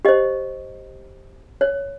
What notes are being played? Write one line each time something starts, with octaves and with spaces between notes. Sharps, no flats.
G4 C5 D#5
C#5